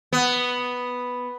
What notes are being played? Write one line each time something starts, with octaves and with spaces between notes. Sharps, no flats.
B3